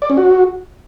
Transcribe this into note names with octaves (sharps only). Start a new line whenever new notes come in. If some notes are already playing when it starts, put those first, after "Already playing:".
D5
C#4
F#4